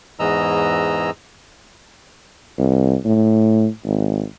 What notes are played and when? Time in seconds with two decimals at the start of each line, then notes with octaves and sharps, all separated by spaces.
0.19 E2 G#2 E3 D#5 A#5 E6
2.59 C2
3.05 A2
3.84 G#1